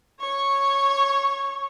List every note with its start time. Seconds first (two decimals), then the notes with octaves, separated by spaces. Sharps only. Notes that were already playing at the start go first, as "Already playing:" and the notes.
0.20 C#5 C#6